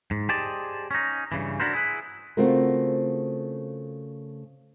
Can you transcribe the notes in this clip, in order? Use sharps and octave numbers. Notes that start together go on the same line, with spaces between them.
G#2
G4 G#4 C5 D5 D#5 A5
C#4 D#4
G2 C#3 E3
D4 E4 F#4 A4 A#4 C5
E4 G#4 B4
C#3 A3 C4 F4 F#4 A#4